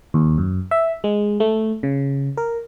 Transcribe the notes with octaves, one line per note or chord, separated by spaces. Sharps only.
D#2
F#2
E5
G#3
A3
C#3
A#4